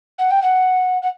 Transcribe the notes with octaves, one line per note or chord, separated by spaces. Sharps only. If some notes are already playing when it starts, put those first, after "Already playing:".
F#5
G5
F#5
F#5